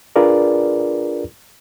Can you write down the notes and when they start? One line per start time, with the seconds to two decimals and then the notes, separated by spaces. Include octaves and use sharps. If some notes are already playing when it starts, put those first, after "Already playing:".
0.16 D4 F4 G#4 A#4 B4 D5